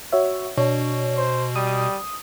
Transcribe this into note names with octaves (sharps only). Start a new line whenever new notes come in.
F#4 C#5 E5
B2 D4 C#5
C5
G3 D#6